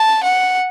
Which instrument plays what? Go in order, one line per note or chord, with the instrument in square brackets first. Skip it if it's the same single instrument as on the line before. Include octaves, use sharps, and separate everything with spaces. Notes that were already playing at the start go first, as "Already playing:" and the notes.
Already playing: [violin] A5
F#5